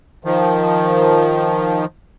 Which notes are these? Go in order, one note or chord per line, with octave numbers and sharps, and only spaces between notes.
D#3 F3